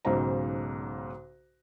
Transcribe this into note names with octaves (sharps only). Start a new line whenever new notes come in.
B1 G#2 C#3 C5 A#5